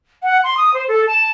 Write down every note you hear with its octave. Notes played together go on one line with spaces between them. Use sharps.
F#5
C6
D#6
C5
A4
A5